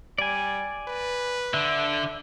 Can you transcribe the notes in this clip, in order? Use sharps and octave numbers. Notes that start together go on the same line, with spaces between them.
G3 D5 G#5
B4
D3 E5